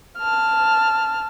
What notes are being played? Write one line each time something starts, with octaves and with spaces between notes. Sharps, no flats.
A5 F6